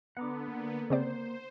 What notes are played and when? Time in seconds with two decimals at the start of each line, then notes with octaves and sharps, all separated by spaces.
0.17 D3 B3 F#5 A#5 D6
0.47 A#3
0.90 C#3 C4 C5 D5